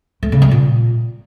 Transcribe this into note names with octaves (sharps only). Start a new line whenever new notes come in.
A3
C#3
G3
A#2